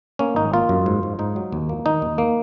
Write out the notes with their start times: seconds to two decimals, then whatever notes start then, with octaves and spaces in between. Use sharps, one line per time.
0.19 A#3 C#4
0.36 G#1 D#4
0.54 A#3 F4
0.69 F#2
0.86 G#2
1.03 G#2
1.19 G#2 D#4
1.36 F#3
1.52 D#2
1.69 A#3
1.86 D#3 D#4
2.02 D#2
2.18 A#3